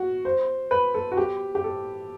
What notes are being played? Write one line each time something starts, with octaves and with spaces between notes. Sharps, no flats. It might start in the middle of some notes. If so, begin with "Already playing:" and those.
Already playing: F#4
C5
B4
A4
F#4
G4
G4
A4